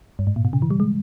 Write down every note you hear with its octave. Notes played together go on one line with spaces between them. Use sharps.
G2
G#2
A#2
B2
C#3
E3
G3
G#3